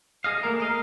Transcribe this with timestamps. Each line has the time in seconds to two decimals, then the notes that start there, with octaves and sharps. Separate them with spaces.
0.24 G#4 D#5 F5
0.43 A3 A#3 A#4
0.60 A#4 D#5 F5